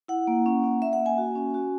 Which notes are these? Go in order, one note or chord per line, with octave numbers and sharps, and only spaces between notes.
E4 F#5
A#3
C#4
C#4
A#3 E5
F#5
A#3
G#5
F#4
C#4
F#4